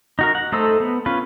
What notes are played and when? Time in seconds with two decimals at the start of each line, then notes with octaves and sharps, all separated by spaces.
0.19 D#4 F#4 A#4
0.35 F#5
0.52 A3 D#4 A4 C5 E6
0.80 B3
1.06 C#4 F4 B4